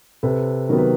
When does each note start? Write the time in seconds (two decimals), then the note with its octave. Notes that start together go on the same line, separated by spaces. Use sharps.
0.23 C3 A4 B4
0.69 D#3 F#3 B3 A#4
0.78 B4